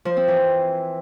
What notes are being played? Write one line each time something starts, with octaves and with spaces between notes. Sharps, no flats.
F3
C4
E3